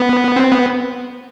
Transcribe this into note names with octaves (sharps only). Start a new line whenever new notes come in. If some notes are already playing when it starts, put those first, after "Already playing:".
Already playing: B3
C4
B3